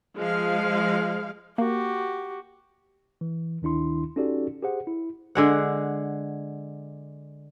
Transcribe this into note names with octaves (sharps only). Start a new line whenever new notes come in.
F3 G#3 F5
A#3 F#4 G4
E3
D2 D#3 D4 E4 C6
C#4 D#4 F#4 G4 A4 D5
G4 G#4 C5 F#5
E4
D3 G#3 F#5